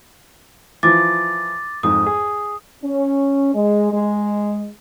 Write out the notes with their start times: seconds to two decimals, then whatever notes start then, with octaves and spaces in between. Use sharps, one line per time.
0.83 E3 F3 F4 D6 A6
1.83 F2 G#2 D#6
2.06 G#4
2.83 C#4
3.55 G#3
3.92 G#3